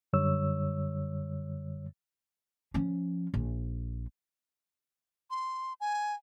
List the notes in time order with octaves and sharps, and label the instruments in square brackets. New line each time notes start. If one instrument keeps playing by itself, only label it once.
[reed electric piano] F#2 D3 G3 C#5 E6
[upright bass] F3 C#4
A#1
[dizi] C6
G#5